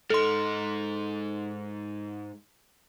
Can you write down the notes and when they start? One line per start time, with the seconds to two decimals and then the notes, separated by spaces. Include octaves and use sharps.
0.10 G#2 D#4 A4 C6